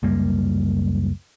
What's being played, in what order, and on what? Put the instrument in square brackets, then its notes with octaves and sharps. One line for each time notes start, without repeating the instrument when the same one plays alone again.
[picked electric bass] C#2 F#2 G3 A#3